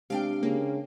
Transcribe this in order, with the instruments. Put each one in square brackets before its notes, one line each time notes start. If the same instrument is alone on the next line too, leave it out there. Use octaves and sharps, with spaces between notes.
[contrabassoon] C3 [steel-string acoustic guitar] G#3 D4 G5 [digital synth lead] F5
[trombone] C#3 [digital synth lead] A#3